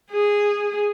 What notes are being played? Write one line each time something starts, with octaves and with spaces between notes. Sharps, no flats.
G#4